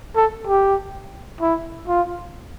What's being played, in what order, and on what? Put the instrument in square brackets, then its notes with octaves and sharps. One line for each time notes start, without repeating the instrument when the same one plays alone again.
[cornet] A4
G4
E4
F4